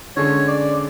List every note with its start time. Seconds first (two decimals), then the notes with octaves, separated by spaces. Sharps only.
0.16 D3 G#3 C#4 C#5
0.47 D5